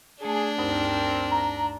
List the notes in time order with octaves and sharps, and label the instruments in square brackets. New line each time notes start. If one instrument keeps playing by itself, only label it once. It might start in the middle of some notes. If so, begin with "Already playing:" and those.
[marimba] A3 A5 [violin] D4 [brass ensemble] G#4
[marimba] D2 G2 D#4 [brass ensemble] C4 A#4
[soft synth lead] A#5